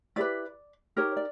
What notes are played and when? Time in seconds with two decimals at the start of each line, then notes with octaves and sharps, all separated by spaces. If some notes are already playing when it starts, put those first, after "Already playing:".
0.16 E4 G4 B4 D5
0.97 D#4 G4 A#4 C#5
1.17 D5